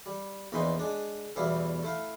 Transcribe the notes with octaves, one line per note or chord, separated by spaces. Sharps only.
G3
A#1 E2 A#2 D#4 B4 C6
G#3 D4
B1 E2 G3 E4 F5
A3 E4 F5